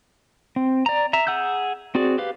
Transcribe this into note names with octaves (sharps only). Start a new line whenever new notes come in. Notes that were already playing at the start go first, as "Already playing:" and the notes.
C4
D5 A#5
E5 A#5
G#4 F#5 E6 G6
C4 F#4 G#4 D5
G4 B4 F5